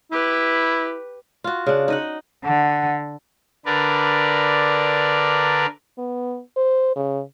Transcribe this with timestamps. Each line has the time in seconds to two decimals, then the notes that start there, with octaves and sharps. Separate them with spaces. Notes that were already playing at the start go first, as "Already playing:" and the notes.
0.12 E4 G4 B4
1.44 F4 F#4
1.66 C#3 D4
1.88 D#4 D#5 F#5
2.45 D3 F#5
3.65 D3 A#4 B4 D5
5.98 B3
6.57 C5
6.96 C#3